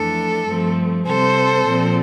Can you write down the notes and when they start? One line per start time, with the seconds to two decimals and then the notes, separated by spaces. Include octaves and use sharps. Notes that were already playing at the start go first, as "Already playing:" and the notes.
Already playing: F2 E3 A3 D4 A4
0.46 G2 F3 A3 C4
1.06 C3 G3 C4 A4 C5
1.66 A#2 F3 C4